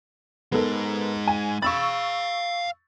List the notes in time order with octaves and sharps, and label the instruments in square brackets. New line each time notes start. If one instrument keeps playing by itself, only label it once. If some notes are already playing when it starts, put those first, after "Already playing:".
[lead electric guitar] G#3 D#4 [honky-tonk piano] B3 A4 A#4
[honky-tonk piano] G#5
[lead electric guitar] F5 B5 [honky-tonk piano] C#6 E6 A6